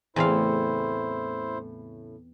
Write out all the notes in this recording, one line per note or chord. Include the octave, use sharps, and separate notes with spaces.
E2 A2 C#3 A3 C4 E4 C5 F5